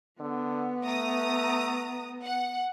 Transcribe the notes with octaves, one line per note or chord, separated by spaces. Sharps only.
D3 B3
A3 A#5 D#6
F#5